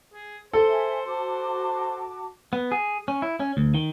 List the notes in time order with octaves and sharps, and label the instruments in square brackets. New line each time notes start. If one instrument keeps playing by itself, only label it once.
[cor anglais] G#4
[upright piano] A4 [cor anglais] C5
[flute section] E5 G#5
[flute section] F#4 A5 D6 [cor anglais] C5
[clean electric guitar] B3
G#4
C#4
E4
C#4
D2
D#3